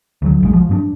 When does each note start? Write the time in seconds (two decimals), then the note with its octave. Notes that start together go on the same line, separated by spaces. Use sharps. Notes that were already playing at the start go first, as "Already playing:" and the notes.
0.22 D2 F3 F#3
0.40 E1 A#1 G#3
0.53 F3 F#3
0.69 G2 B3 D4